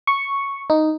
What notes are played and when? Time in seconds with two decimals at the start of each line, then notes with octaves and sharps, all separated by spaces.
0.07 C#6
0.70 D#4